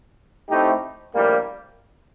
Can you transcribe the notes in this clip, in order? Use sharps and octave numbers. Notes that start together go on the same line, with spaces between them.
A2 A3 C4 D#4 G4
A#1 A2 G3 A#3